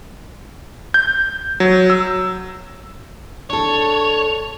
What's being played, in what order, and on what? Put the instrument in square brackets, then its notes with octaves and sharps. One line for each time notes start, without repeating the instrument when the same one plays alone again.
[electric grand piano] G6
F#3
E6
[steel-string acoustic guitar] D4 A4 [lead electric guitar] C#5